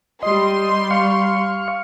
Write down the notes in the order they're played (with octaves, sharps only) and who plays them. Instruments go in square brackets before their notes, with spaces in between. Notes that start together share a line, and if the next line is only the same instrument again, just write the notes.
[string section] G3 C6 [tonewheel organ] D#5
[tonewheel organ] F5 C#6